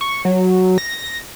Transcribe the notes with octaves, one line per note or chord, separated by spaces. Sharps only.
C#6
F#3
A#6